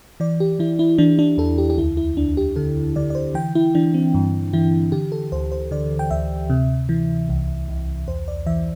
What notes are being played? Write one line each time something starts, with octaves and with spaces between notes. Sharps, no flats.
E3 D5
G4
E3 E4
E4
E3 D4
D4
E2 A4
G4
G4
D2 E4
E4
D2 D4
G4
D3 A4
D3 D5
D5
C5
E3 G5
E4
E3 D4
C4
G2
E3 E4
D3 G4
A4
D2 C5
C5
D3 D5
G5
D2 E5
C3
E3
C2
C2
E2 C5
D5
E3 E5